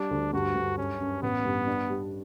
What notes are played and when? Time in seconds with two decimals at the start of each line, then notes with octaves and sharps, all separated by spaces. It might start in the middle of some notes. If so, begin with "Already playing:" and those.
Already playing: G3 D4
0.11 D2
0.33 G2 F#4
0.55 G2
0.78 F#2 C#4
1.00 F#2
1.22 A1 B3
1.45 G2
1.67 D4
1.90 G3